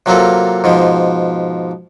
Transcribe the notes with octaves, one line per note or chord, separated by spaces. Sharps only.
C3 F#3 A#3 F4 A4
G#2 B2 F3